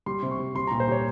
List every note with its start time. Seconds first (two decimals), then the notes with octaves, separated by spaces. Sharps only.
0.06 G3 C6
0.23 C3
0.31 C#6
0.39 G3
0.55 G3 C6
0.67 A#2 A#5
0.80 C5
0.88 G3 C#5